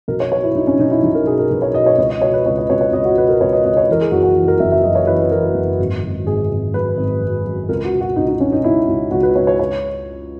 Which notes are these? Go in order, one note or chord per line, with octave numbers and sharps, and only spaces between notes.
B1 A#4
C#5
B2 C#5
E4
B1 D#4
C#4
B1 D#4
E4
B1 D#4
A#4
B2 G#4
A#4
B1 B4
C#5
B2 D#5
C#5
C#2 D#5
D#5
B2 C#5
B4
C#2 C#5
D#5
C#2 C#5
C#5
C#2 D#5
F#4
B2 B4
A#4
C#2 C#5
D#5
C#2 D#5
C#5
E3 A#4
G#4
F#1 F#4
F#4
E3
A#4
F#1 E5
E5
F#2 D#5
C#5
E3 B4
B4
E3 A#4
F#1
G#1
G#1
G#1 G#4
G#1
F#2 B4
G#1
F#2
F#2
C#2 A#4
F#4
B2
F#4
C#2 D#4
D#4
B2 C#4
D#4
C#2 E4
C#2
C#2 F#4
B4
C#2 C#5
C#5
C#5